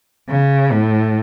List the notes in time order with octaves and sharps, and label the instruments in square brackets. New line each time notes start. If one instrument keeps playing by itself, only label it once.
[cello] C#3
A2